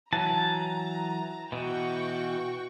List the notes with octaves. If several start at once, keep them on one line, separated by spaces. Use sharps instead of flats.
E3 F#3 A5 A#5
B2 E3 F#4 G5 C#6